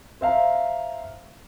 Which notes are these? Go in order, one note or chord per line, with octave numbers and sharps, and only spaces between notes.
C5 E5 F5 A#5